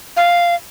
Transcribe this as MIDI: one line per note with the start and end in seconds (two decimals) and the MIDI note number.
0.17 0.55 77